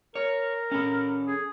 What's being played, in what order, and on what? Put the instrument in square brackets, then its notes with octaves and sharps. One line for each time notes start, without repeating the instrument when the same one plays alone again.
[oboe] A#4 [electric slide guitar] C#5
[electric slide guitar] C#4 A4
[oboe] G#4